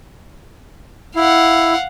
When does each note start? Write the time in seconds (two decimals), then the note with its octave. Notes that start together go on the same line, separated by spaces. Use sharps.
1.16 E4 F5 F#5